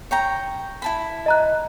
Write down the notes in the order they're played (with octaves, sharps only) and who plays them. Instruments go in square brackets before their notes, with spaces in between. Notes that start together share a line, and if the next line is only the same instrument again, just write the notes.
[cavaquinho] C#5 G5 A#5
E4 A5 B5
[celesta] D#5 A#5 F#6